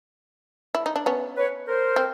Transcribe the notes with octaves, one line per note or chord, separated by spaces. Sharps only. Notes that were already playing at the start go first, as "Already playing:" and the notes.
E4
D#4
D4
B3 C#4
B4 C#5
A#4 C5
C4